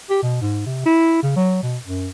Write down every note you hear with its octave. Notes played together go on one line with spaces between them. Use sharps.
G4
B2
G#2
C3
E4
C#3
F#3
B2
F#2